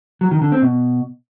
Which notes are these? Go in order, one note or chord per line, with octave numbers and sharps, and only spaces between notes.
F#3
D#3
D3
C4
B2